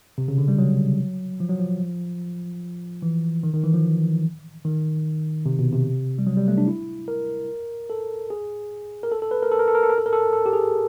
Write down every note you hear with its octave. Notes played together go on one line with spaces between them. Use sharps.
C3
C#3
D3
G3
F#3
F3
F#3
F3
E3
D#3
D#3
E3
F3
D#3
C3
B2
C3
G3
F#3
G3
A3
D4
E4
A#4
A4
G#4
A#4
A4
A4
B4
A#4
A4
A#4
A4
A#4
A4
A#4
A4
A#4
A4
A4
G4
G#4